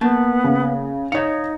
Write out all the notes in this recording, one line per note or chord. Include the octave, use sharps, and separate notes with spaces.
A#3 B3 A5
C#3
D#4 C#5 F5 G#6 C#7